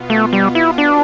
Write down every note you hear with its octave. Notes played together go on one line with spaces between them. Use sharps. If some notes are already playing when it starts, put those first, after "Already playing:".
Already playing: B2 B3 F4
A3
G3
E4
D4